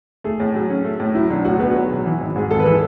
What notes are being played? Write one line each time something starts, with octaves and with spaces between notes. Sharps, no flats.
A3 G#4
A2
F#3
C#4
A3
A2
F#3 E4
B1 D4
A2 F#4
B3 G#4
F#3 F#4
B1
E3
G#1
G#2 G#4
G#1 A4
B4
E3 A4